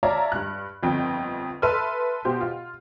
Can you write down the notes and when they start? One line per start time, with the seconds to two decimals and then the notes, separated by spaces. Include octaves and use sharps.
0.03 C#5 D5 E5 F5 A5 A#5
0.32 G2 F#6
0.82 G1 F2 G5
1.62 A4 B4 E5 C6 E6 F6
2.25 B2 G4 C5
2.41 F4